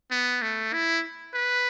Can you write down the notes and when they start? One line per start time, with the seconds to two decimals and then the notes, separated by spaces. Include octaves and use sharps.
0.11 B3
0.42 A3
0.73 E4
1.35 B4